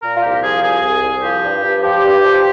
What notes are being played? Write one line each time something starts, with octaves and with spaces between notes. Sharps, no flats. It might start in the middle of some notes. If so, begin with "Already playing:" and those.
A#2 A#4
F4
C2 G4
F3 G#4
C2 G#4
C2
C2
F3 G4
G2
G2
F3 G4
G2
F3